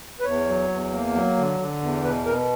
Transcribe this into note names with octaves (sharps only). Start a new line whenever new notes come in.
B4
E2 C#5
F#3
E2
A#3
F#3
D3
D3
E2
B2 B4
B2 A#4